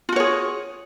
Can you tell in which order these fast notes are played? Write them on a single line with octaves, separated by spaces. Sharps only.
F4 F#4 C#5 G#4